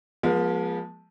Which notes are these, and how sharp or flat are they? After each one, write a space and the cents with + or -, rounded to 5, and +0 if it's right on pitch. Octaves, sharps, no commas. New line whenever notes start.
F3 +10 G#3 +0 B3 -45